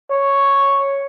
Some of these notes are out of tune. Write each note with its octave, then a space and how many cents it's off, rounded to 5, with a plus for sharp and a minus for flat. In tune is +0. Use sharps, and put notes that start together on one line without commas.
C#5 +0